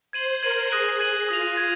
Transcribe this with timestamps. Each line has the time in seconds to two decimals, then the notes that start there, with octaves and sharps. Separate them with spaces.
0.13 C5 G#6 D#7 F#7
0.42 A#4 G#6 D#7 F#7
0.71 G#4 D#6 F#6 A#6 D#7 F#7
1.00 G#6 D#7 F#7
1.29 F4 D#6 A#6 F7
1.57 G#6 D#7